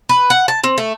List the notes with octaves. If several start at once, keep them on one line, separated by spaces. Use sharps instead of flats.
B4
F#5
A5
C4
A3